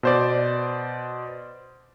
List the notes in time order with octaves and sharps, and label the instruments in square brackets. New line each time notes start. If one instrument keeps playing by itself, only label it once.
[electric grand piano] B2 C5 D5